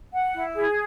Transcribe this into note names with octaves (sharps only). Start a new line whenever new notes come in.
F#5
E4
G#4